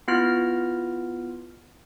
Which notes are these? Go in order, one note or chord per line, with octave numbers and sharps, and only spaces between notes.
B3 E4 F4 F6